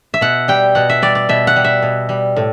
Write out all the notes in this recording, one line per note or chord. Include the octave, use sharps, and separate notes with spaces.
E5
B2 F#5
G3 G5
B2 F#5
E5
G3 D5
D5
B2 E5
F#5
G3
E5
B2
G3
A2